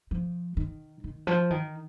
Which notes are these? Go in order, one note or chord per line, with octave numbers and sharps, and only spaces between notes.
F3
D#3
D#3
F3
D#3